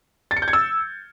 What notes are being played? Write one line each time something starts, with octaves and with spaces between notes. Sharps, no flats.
A6
C#7
G6
G#6
E6